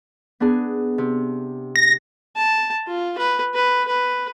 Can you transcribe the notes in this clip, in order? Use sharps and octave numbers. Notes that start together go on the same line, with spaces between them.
B3 D4 G#4
C3
A#6
A5
F4
B4
B4
B4